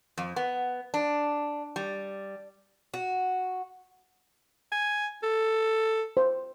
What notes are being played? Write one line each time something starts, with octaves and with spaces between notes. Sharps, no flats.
F2
B3
D4
G3
F#4
G#5
A4
C5